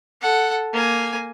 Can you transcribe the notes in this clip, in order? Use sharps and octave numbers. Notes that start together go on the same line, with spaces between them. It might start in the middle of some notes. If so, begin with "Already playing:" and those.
A4 F#5
A#3 G#5